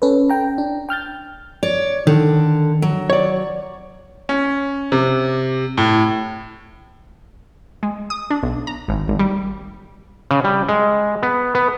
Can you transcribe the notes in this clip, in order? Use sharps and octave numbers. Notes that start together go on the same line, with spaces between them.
C#4 A4 B4
G5 A#5
D4
G5 F6 G6 A6
C#5 D5
D3 D#3
F#3
C#5 D5
C#4
C3
A2
G#3
D#6
D4
B1
A#5
G#1
G#1
G3
C#3
G3
G#3
B3
B3